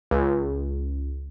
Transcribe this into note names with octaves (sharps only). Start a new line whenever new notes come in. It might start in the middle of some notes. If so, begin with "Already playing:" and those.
C#2